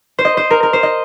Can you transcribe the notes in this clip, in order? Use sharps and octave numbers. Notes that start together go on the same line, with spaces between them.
C5
D#5
C5
A#4
A#4
C5
D#5